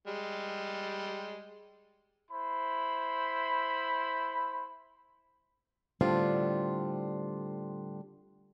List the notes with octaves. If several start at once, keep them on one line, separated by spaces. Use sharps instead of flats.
G3 G#3
E4 C5 B5
A2 D3 G3 C4 D4 F4